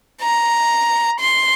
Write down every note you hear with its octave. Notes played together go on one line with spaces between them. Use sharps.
A#5
C6